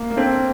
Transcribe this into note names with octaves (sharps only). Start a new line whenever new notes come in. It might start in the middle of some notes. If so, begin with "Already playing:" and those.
Already playing: A#3
A#3
C4 D4 A4 C5 G5